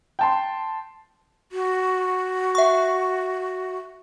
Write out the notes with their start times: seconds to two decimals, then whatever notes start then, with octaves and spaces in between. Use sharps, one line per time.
0.19 G5 A5 C6
1.52 F#4
2.55 E5 C#6